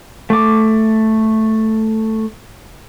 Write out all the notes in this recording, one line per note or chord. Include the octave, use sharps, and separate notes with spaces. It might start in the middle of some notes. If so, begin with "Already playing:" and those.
A3 D6